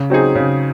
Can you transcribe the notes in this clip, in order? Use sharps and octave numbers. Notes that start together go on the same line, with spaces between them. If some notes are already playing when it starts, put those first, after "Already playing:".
Already playing: C#3
F#3 C4 D#4 G#4
C#3